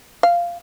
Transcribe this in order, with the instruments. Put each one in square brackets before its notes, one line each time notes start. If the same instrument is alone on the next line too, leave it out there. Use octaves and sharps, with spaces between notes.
[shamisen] F5